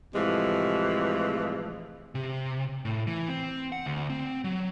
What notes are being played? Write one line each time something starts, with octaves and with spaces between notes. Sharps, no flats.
A2 C3 E3 F3 G#3
C3
A2
E3
C4
F#5
D2
C4
F#3